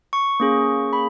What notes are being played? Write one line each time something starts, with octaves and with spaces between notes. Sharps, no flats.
C#6
A#3 C#4 G#4
B5